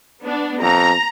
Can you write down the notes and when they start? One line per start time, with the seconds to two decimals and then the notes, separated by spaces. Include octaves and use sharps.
0.21 B3 D4
0.62 F2 A#5